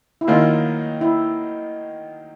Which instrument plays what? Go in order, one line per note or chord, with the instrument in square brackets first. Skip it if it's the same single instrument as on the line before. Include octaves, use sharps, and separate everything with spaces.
[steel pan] E4
[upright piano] D#3 F#3 A#3 D#4 [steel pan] F4
[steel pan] E4